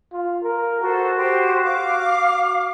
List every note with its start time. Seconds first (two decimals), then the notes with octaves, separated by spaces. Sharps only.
0.12 F4
0.43 A#4
0.81 F#4 A4 C5
1.17 G4 C5
1.62 F5 D6